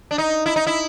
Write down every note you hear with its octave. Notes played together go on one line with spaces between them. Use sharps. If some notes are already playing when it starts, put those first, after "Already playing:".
D4
D#4
E4
D#4
E4